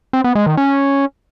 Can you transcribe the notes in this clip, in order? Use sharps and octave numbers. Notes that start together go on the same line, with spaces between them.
C4
B3
G#3
D#3
C#4